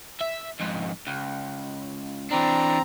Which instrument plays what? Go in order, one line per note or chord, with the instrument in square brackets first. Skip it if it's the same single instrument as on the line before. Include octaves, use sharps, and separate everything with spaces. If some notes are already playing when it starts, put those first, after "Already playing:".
[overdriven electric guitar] E5
F2 G#2
C#2
[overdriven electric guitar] E3 D4 [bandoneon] C4 A#5